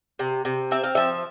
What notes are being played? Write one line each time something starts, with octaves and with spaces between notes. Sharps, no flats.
C3
C3
C4 E5
F5
F3 E5